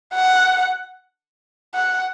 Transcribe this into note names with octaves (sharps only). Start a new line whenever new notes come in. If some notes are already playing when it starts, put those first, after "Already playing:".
F#5
F#5